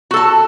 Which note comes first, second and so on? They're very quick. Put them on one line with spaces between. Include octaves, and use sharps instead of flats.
F#4 A4 A5